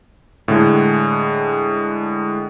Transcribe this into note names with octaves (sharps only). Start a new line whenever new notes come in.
A2 D3 G#3